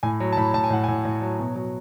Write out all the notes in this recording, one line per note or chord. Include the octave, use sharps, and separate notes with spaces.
A2 G#5
F#3
A5
A2 B5
A2 A5
G#5
A2 F#5
A2 G#5
A2
F#3
B2
F#3